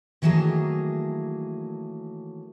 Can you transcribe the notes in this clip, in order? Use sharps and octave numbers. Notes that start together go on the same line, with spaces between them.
D#3 E3 F#3 A3 A#3 G#4